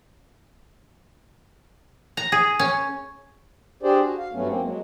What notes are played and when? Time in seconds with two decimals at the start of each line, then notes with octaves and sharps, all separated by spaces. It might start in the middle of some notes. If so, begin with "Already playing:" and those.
2.17 A#5
2.32 G#4
2.59 C#4
3.83 D4 G4 G#4 C5 D5
4.03 F#4
4.18 F5
4.33 G2 F#3 A3 B3 C#4
4.48 A#3 C4
4.62 F#3 G#3